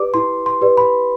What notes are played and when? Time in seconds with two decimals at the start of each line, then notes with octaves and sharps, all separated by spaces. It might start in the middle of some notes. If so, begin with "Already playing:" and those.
Already playing: G4 B4 D5 D6
0.14 E4 C6
0.46 C6
0.61 G4 B4 D5
0.77 B5